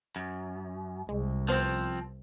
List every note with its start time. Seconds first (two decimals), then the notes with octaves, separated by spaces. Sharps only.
0.16 F#2
1.09 C2 G#3
1.48 F3 B3 C4 C5